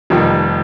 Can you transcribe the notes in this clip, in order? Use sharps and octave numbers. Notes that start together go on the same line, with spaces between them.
F1 F2 D#3 G3